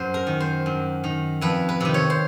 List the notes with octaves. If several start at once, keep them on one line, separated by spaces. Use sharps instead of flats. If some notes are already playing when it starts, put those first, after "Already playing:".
Already playing: F#2 C5
A#4
D#3
C5
F#2
D#3
F2 B4
B4
C3 D#3
C#5
C5